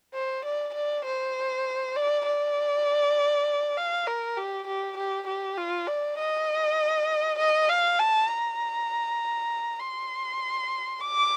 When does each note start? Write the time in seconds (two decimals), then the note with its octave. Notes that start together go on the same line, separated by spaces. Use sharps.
0.14 C5
0.45 D5
0.74 D5
1.05 C5
1.96 D5
2.26 D5
3.77 F5
4.07 A#4
4.37 G4
4.67 G4
4.97 G4
5.27 G4
5.57 F4
5.87 D5
6.18 D#5
7.39 D#5
7.69 F5
7.99 A5
8.29 A#5
9.80 C6
11.00 D6